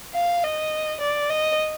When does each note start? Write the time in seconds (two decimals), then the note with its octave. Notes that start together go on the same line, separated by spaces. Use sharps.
0.15 F5
0.44 D#5
1.01 D5
1.30 D#5